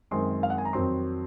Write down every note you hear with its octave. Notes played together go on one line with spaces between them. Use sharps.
F#2 D#3 G#3 C4 C6
F5
F#5
G#5
A#5
F2 D#3 F#3 C4 C6